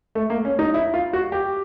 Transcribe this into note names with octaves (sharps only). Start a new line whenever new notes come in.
A3
A#3
C#4
D#4
E4
F4
F#4
G4